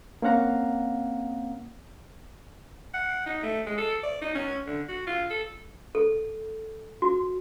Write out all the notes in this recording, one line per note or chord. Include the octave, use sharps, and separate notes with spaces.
A#3 C4 C#4 F5 F#5 A#5
F#5
D#4
A3
G#3
A4
D5
D#4
C#4
D3
F#4
F4
A4
A4
F#4